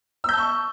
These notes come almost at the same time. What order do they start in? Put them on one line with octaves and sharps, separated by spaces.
E6 G6 A5 C#6